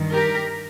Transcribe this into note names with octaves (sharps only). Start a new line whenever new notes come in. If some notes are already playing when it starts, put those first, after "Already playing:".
Already playing: G2 D#3
G4 A#4